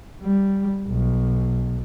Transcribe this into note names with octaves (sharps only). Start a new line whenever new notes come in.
G3
B1